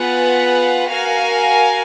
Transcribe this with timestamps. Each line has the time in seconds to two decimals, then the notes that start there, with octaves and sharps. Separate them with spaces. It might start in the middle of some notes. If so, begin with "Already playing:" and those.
Already playing: B3 F4 G#4 B4 F#5
0.90 F#4 A#4 F5 G#5